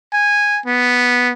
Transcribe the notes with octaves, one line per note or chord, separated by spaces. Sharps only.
G#5
B3